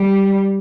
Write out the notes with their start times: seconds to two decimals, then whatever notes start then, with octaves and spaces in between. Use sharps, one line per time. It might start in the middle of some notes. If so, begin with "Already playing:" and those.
Already playing: G3